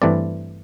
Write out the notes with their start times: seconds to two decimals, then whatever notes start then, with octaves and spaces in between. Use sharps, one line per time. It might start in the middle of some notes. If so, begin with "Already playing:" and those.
0.02 G2 E3 A3 C4 D5